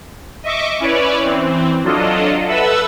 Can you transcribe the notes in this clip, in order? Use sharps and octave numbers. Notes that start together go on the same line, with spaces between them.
D#5 E5 C#6 D6
C#4 E4 B4 C#5 D5
E3 C4
F#3 D4 F4 A4 D#5
A4 B4 E5 F#5 E6